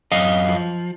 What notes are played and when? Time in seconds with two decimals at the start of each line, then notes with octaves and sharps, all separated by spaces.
0.12 F#2 D#5 F5
0.48 F3